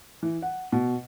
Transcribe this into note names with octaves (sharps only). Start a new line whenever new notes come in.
E3
F#5
B2